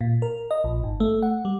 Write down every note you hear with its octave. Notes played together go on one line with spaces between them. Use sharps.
A#2
A#4
D#5
A#1
G#1
A3
F#5
G3